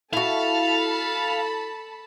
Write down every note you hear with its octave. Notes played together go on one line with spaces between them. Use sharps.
E4 F#4 A4 F5 A5 B5